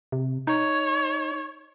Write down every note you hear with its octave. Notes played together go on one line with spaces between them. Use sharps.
C3
D#4 C#5